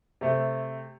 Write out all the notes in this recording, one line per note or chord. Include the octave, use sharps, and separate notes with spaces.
C3 A3